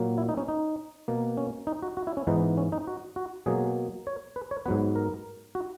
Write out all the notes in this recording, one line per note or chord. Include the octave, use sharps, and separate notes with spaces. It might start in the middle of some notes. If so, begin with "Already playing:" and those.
Already playing: A#2 F#3 A#3
E4
D#4
C#4
D#4
B2 A#3
C#4
D#4
F#4
F#4
E4
C#4
G#2 E3 B3 D#4
C#4
D#4
F#4
F#4
B2 F#3 A#3 G#4
C#5
B4
C#5
G#2 F#3 B3 B4
A#4
F#4